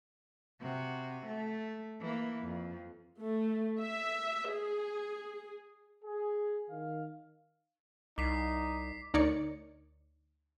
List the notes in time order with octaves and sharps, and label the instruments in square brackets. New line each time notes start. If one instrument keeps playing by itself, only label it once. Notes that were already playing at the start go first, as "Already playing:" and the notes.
[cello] C3 F#4
A3
E3 A#3
F2
[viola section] A3
E5
G#4
[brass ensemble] G#4
D#3 F5
[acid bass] C2 [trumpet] D#4 [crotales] D6 B6 C7
[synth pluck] D2 D#4 A#4 C#5 D5 C#7